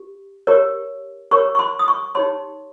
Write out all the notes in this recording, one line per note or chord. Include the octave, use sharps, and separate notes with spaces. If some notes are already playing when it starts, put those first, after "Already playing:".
Already playing: G4
G4 A#4 C#5
G4 A#4 C#5 C#6
C#6
C6
D#6
C#6
D#4 G4 C#5 C6